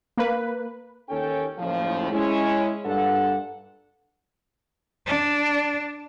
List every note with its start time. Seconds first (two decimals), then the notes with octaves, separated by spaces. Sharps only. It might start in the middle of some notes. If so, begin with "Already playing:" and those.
0.17 A#3 B4
1.09 D#2 C#4 A4 G5
1.59 F#1 D#2 A2 F3
2.11 G#3 C#4 E4
2.85 G2 A#2 A4 F#5
5.06 D4